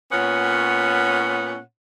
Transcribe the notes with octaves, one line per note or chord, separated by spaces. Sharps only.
A#2 B3 C#4 C#5 F#5